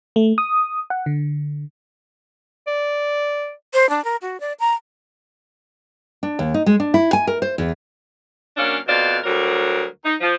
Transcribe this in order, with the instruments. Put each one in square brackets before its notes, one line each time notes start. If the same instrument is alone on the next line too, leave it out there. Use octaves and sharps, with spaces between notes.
[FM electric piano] A3
D#6
F#5
D3
[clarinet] D5
[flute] C5
D4
A#4
F#4
D5
A#5
[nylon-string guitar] D4
D#2
D#4
G#3
D4
E4
G#5
A#4
C5
E2
[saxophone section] F#2 A#3 C#4 D4 F5
F2 B2 C5 D5 F5
D2 F#3 G3 A#4
D#4
F3